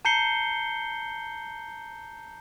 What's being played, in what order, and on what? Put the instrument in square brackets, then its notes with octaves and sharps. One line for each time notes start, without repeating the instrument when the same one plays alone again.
[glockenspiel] A5 A#5 G6 C7 C#7 G7